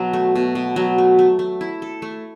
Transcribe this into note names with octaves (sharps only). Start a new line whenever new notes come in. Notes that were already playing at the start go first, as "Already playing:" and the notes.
Already playing: B2 F#3
A3
B2
B2
F#3
A3
A3
A3
E4
A4
A3